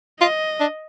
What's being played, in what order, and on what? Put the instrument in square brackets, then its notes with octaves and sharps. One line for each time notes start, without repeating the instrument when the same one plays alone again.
[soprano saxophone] F4 [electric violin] D#5
[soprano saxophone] D4